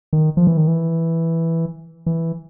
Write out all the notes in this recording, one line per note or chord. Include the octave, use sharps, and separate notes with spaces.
D#3
F3
E3
D#3
E3
E3